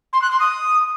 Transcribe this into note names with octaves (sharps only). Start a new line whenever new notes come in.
C6
F#6
C6
D#6